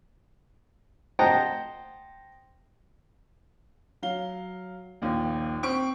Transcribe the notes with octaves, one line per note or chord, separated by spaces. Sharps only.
C5 D#5 F#5 G5 A5 A#5
F#3 F5 G7
A#1 D#2
C4 C#6 D7